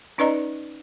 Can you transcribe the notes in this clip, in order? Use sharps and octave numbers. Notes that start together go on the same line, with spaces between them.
C#4 D#4 B4 D5 D#5 A#5